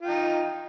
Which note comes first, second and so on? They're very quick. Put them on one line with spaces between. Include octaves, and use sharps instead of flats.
F4 G5 D#4